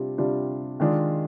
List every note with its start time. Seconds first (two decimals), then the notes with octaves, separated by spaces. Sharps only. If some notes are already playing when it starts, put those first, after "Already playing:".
Already playing: C3 G3 D4 F4
0.18 C3 G3 D4 F4
0.80 D#3 G#3 D4 F4